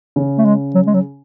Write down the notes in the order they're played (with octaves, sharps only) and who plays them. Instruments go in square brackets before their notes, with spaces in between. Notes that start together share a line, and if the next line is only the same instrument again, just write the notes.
[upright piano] C#3
[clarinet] A3
G#3
F#3
G#3
F#3